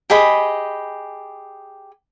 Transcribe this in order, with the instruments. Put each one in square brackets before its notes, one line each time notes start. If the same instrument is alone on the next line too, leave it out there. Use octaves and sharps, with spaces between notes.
[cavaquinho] G4 G#4 D#5 B5